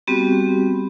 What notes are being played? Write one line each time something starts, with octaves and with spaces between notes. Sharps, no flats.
G3 B3 C4 F#4 G4